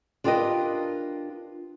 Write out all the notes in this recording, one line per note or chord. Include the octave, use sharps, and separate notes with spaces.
D4 F4 G4 A#4 B4 D#5